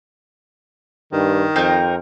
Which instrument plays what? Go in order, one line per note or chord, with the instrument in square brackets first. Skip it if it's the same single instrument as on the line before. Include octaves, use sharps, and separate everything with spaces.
[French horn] G2 [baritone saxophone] D#3
[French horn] F2 [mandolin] C4 D#4 A#4